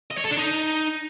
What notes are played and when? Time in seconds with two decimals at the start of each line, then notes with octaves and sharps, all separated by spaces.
0.11 D#5
0.18 C#5
0.25 A4
0.31 D4
0.38 D#4